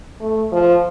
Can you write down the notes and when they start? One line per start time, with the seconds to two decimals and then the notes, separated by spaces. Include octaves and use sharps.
0.20 A3
0.52 F3